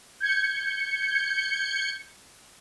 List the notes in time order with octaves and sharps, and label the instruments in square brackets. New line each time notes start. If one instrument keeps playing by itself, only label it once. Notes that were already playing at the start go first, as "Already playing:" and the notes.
[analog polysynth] G6 G#6 C#7